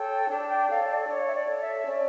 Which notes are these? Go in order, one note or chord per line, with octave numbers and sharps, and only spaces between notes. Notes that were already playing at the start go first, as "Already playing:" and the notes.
Already playing: A4 C#5 G5
D4 A5
G5
A4 C#5 F5
D5
D4 C#5
E5
D5
A4 C#5
E5
C#4 D5